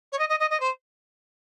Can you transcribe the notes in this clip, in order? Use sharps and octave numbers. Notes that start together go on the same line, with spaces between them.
C#5
D#5
D#5
D#5
D#5
C5